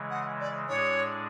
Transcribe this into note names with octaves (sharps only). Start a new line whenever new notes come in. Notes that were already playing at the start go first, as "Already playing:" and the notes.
Already playing: C#3 E3 G#3
F#5
D5
A2 G#3 D4 G#4 C#5 D5